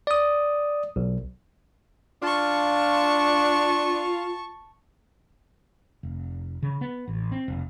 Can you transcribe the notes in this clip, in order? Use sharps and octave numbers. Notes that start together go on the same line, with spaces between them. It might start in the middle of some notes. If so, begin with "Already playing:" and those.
D5 D#6
B1
D4 F4 A5 C#6
F1
C#3
B3
A1
C4
F1